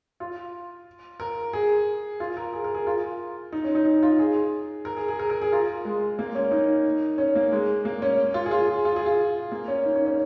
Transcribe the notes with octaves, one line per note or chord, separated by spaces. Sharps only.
F4
A#4
G#4
F4
A#4
G#4
A#4
G#4
F4
D#4
C#4
D#4
D#4
F4
G#4
A#4
G#4
G#4
A#4
A#4
G#4
F4
G#3
A#3
C#4
D#4
C#4
A#3
G#3
A#3
C#4
F4
G#4
F4
G#4
F4
G#4
F4
A#3
C#4
D#4
C#4
C#4